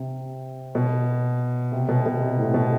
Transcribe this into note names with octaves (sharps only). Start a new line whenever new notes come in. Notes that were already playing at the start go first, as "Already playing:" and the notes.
Already playing: C3
B2
C3
B2
B2
C3
A2
B2